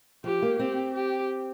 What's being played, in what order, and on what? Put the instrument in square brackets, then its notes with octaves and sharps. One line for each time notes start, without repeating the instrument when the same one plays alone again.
[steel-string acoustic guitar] F3 [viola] G4
[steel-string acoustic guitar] A#3
[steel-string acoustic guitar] C4 [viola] G4
[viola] G4